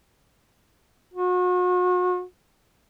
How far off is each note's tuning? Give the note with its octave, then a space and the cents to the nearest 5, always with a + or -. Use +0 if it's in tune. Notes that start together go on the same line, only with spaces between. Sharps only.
F#4 -40